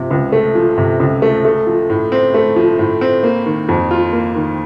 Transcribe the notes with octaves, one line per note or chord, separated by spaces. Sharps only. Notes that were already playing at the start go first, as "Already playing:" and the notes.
Already playing: C3 F3
C#2
A3
F3
C3
C#2
A3
A3
F3
A2
C4
A3
F3
A2
C4
A#3
D#3
F2
F4
A#3
D#3